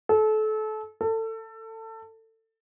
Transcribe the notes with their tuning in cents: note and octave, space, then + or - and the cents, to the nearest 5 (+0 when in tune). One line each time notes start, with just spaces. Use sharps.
A4 -30
A4 +25